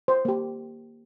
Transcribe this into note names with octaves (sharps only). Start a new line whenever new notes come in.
C5
A#3 G4